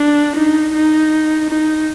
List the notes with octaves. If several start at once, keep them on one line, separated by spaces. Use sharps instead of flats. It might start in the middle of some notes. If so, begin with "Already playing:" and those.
Already playing: D4
D#4
D#4
D#4